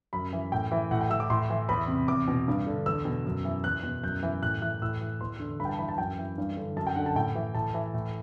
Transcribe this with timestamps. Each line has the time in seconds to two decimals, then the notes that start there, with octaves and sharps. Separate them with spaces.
0.13 F#2 B5
0.33 E3
0.52 A2 G5
0.72 E3
0.91 A2 F#5
1.01 G5
1.10 E3 E6
1.20 D6
1.30 A2 C6
1.50 E3
1.69 E2 B5
1.88 C3
2.08 E2 D6
2.28 B2
2.48 G2
2.67 D3
2.86 E2 E6
3.05 B2
3.26 F#2
3.45 E3
3.64 E2 F#6
3.83 B2
4.03 F#2 G6
4.23 E3
4.43 A2 F#6
4.62 E3 F#6
4.82 A2 E6
5.01 E3
5.21 E2 C6
5.39 D3
5.60 G2 B5
5.65 G5
5.69 A5
5.79 E3 B5
5.89 A5
5.98 F#2 G5
6.18 E3
6.38 G2
6.57 D3
6.76 F#2 A5
6.87 G5
6.96 D3 F#5
7.06 A5
7.15 A2 G5
7.35 E3
7.55 A2 A5
7.74 E3
7.94 A2